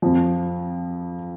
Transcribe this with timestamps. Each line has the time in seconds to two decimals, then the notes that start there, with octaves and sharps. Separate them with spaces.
0.02 F2 F3